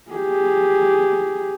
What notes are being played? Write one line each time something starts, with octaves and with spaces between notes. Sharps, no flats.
G4 G#4